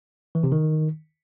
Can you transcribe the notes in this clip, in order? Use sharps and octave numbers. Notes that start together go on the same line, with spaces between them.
E3
C3
D#3